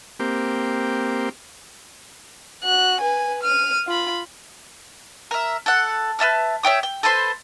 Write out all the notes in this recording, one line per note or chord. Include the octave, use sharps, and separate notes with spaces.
A#3 C4 G4
F#4 F#6
B4 G#5
F6 D#7
F4 B5
A#4 E5
A4 F#5
B4 E5 A5 F6
C#5 E5 G5 D#6
G5
A4 B4 C5 C6